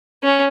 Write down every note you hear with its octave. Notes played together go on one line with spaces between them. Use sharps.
C#4